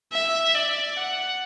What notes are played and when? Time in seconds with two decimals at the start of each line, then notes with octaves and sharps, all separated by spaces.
0.12 E5
0.55 D5
0.97 F#5